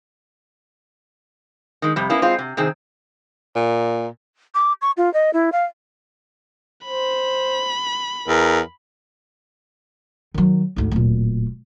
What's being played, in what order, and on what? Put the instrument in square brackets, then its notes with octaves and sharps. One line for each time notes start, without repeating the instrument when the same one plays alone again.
[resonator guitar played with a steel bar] D#3 G#3
F2 C3 G3
A#3 B3 C#4 E4
G#3 C4 F4
C3
C3 D#3 C4 G#4
[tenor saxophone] A#2
[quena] D6
C#6
F4
D#5
E4
F5
[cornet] C5 [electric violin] B5
[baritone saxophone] E2 [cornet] A#4
[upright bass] D#3 F#3
D2 G#2
D1 A#2